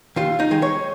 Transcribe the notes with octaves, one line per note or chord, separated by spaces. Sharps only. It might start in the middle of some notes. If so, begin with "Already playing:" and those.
D#2 F4
D#4
D#3 G#3
C#5